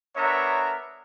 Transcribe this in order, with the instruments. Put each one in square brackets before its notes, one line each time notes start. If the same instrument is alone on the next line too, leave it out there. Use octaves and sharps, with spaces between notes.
[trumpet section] B3 D4 A#4 C#5 E5 A#5